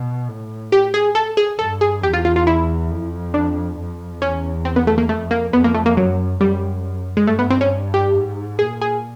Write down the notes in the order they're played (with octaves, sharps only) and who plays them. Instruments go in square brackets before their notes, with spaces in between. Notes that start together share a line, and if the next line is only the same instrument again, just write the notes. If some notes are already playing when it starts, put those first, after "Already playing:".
Already playing: [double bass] B2
A2
[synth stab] G4
G#4
A4
G#4
[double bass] G2 [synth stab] A4
[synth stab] G#4
[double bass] E2 [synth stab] G4
[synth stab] F4
F4
F4
E4
[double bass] F2
[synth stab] D4
[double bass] F2
[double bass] E2 [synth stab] C#4
[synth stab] C4
B3
A3
A#3
[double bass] F2 [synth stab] A3
[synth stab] A#3
[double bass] F2 [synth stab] B3
[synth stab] A#3
A3
A#3
[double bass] F#2 [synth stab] F#3
[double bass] F#2 [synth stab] G3
[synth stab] G#3
[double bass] G2 [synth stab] A3
[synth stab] B3
C4
C#4
G4
[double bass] G#2
[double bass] A#2 [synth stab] G#4
[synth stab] G#4